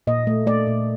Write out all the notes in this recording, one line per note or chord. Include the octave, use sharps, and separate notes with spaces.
A#2 D#5
A3
A3 D5
A#2